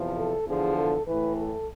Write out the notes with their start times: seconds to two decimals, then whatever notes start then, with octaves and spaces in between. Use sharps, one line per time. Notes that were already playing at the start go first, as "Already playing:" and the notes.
Already playing: E2 C3 F3
0.17 A4
0.47 E2 D3 F3 G#4
0.77 A4
1.06 A2 E3 B4
1.36 A4